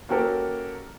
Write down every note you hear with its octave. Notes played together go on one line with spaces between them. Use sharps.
A#3 C#4 F#4 G4 A4 A#4